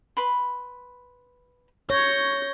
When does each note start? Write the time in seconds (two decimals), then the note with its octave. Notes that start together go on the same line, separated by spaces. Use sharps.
0.17 B4 B5 C6
1.90 C#5 G6 A#6